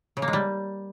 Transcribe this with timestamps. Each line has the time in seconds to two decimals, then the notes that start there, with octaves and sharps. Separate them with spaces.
0.17 C#3
0.22 A#3
0.28 G#3
0.33 G3